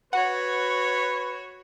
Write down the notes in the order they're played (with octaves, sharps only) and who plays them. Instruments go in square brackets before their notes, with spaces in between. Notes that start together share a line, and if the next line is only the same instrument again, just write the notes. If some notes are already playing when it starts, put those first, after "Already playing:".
[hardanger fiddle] F#4 C#5 [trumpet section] B4 [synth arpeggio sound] F#5